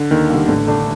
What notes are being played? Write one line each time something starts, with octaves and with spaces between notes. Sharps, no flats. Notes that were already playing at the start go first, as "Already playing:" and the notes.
Already playing: D3
D#2 D#3
D3 G3 A#3
A1 D3
A2 A3 D4